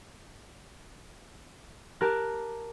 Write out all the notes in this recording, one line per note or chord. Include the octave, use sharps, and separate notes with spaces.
G4 A#4 A5 F#6